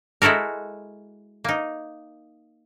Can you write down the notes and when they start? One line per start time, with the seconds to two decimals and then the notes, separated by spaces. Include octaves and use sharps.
0.22 G#3 E4 F#4 A4 A#4
1.44 A#3 D#4